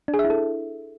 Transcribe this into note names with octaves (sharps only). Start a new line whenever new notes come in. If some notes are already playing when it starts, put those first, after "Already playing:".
D4
G#4
E5
E4
A4